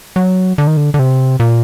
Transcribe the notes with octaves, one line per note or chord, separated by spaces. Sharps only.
F#3
D3
D#3
D3
D3
C3
A#2